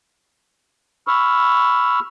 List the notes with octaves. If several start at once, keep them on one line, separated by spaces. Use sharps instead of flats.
B5 C#6 E6 F6